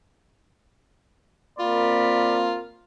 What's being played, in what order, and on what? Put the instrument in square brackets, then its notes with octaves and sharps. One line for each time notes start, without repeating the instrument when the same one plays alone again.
[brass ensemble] A#3 C4 A#4 [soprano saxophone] F4 [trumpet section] D5 B5